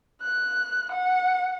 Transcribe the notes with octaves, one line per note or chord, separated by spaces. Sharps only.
F#6
F#5